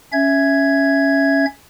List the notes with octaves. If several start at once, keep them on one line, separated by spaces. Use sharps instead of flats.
C#4 E5 G#6